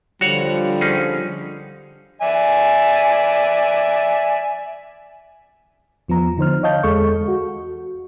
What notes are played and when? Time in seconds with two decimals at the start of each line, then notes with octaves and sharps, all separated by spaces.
0.21 D3 F3 G3 F#4 C#5 F#5
0.81 C#4 D#4 G#4
2.22 D5 E5 G#5
6.08 E2 F3 B3 A#5
6.38 D3 D#4 C5 F6
6.63 C#5 D#5 F5 A5 G6
6.83 E2 G#3 A4 C#6
7.28 F#4